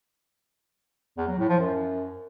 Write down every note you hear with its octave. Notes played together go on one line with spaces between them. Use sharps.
E2
F#3
A2
F3
F#2